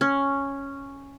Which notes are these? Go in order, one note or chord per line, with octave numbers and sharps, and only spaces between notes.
C#4